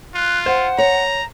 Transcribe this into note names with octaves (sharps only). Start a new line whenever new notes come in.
F4 F#6
C5 F#5
C#5 A#5